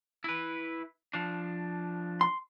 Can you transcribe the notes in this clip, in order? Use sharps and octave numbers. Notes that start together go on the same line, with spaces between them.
E4 B4
F3 D4
C6